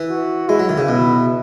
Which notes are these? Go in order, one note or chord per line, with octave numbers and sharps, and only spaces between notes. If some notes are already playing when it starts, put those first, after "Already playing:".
Already playing: E3
F#4
G#3 E4
F#3
D#3
C#3
B2